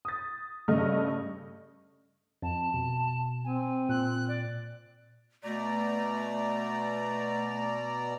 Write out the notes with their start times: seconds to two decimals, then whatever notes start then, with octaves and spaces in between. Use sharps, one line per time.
0.05 D#6 A6
0.68 G2 C#3 A3 D#5 F6
2.42 F2 A5
2.74 B2
3.44 C4 G#5
3.89 A#2 F#6
4.28 D5
5.44 B2 A3 D5 A#5